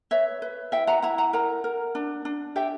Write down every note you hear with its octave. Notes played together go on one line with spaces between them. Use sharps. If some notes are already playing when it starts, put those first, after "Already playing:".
B4 C#5 E5
B4
E4 E5 G5
F#5 A#5
E4 F#5 A#5
F#5 A#5
A#4 F#5 A#5
A#4
D4
D4
G4 E5 G5